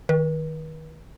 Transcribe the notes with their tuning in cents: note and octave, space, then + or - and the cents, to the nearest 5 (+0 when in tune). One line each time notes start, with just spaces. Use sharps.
D#3 +0 B4 -40